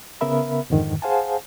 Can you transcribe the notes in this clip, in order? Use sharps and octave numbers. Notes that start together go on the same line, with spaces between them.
C#3 B3 A#4 E5 B5
F2 G#2 D3 D#3
G#4 C5 F5 F#5 G#5 A5